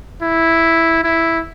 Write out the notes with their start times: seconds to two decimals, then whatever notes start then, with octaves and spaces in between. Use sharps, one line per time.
0.22 E4
1.03 E4